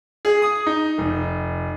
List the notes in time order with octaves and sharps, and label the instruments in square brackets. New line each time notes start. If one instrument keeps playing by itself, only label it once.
[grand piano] G#4
D#6
D#4
F1